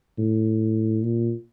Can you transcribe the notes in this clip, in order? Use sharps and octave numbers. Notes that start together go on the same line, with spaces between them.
A2
A#2